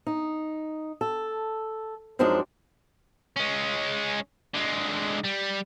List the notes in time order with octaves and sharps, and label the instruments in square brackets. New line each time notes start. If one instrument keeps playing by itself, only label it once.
[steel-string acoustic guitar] D#4
A4
F#2 F3 G#3 C4 D4 D#4
[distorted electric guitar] G#3 C#4
D3 G#3
G3